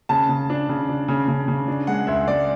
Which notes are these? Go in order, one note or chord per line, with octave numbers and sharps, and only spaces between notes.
C#3 A5
C#3
D4
C#3
D4
C#3
C#3
C#3
D4
G#3 F#5
C#2 E5
G#3 D5